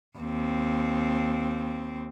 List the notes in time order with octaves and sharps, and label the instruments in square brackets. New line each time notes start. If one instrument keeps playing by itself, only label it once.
[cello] D#2 C4